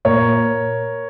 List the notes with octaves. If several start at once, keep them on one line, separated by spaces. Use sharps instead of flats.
A#2 A#4 C#5